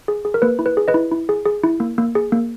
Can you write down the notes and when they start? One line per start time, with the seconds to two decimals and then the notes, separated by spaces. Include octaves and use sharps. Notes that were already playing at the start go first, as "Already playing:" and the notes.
0.08 G#4
0.25 G#4
0.34 A#4
0.42 A#3 B4
0.59 E4
0.66 B4
0.77 G#4
0.88 B4 D#5
0.94 E4
1.12 E4
1.29 G#4
1.45 G#4
1.64 E4
1.80 A#3
1.98 A#3
2.15 G#4
2.32 A#3